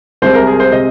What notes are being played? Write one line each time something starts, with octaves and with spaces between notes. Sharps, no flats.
C2 C3 G#3 C5
A#4
G#4
C5
C3 G#3 D#5